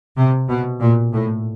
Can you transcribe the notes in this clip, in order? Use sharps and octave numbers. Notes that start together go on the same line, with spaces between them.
C3
B2
A#2
A2